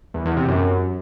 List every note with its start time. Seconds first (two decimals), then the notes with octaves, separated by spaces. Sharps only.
0.14 E2
0.26 E2
0.37 C3
0.48 F#2